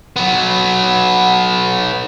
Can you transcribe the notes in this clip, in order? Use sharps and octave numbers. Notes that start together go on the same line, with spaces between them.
F#3 B3